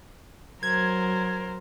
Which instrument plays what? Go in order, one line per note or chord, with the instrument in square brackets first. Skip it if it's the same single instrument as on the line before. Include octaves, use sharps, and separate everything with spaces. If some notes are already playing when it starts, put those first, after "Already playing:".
[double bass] F#3 [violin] A#4 C5 [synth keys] G#6